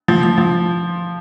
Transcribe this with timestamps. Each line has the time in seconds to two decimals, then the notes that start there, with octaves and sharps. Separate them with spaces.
0.08 F3
0.23 F3
0.38 F3